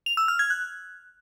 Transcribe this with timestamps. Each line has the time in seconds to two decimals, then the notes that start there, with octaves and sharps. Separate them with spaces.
0.06 F7
0.17 E6
0.28 F6
0.39 G#6
0.50 F#6